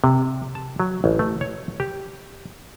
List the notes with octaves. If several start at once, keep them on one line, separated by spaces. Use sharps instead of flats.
C3
A5
F#3
A1
A3
C#5
G4